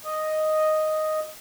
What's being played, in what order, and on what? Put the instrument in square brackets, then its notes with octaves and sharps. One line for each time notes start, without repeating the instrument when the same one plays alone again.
[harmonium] D#5